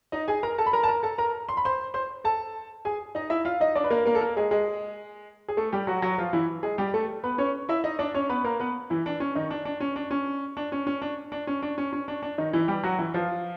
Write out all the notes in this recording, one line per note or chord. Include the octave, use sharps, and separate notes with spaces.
D#4 D#5
G#4 G#5
A#4 A#5
A4 A5
B5
A#4 A#5
A5
A#4 A#5
A4 A5
A#4 A#5
C6
B5
C5 C6
C5 C6
A4 A5
G#4 G#5
D#4 D#5
E4 E5
F4 F5
D#4 D#5
D4 D5
B4
A#3 A#4
A#3 A#4
A4
A#3 A#4
G#3 G#4
G#3 G#4
G#4
A3 A4
G3 G4
F#3 F#4
F#3 F#4
F3 F4
E3 E4
G#3 G#4
G3 G4
A3 A4
B3 B4
C#4 C#5
E4 E5
D#4 D#5
D4 D5
C#4 C#5
B3 B4
A#3 A#4
B3 B4
E3 E4
D4
C#4
D#3 D#4
D4
D4
C#4
D4
C#4
D4
C#4
C#4
D4
D4
C#4
D4
C#4
C#4
D4
D4
D#3 D#4
E3 E4
G3 G4
F#3 F#4
E3 E4
F3 F4